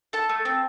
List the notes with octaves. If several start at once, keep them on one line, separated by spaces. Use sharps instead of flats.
A4 A5
A3
C4